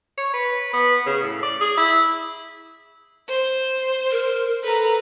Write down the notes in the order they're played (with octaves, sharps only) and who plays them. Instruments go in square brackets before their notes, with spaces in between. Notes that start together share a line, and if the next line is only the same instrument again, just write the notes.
[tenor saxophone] C#5
B4
B3
C#3
A2
D5
G#4
E4
[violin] C5
[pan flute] A#4
[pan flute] A4 [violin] B4 A#5